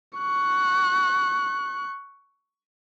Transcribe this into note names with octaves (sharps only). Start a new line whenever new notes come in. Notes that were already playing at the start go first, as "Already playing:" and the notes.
C#6 F#6